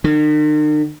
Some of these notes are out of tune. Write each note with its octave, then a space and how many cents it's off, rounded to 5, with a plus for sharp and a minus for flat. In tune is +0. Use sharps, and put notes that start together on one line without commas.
D#3 -45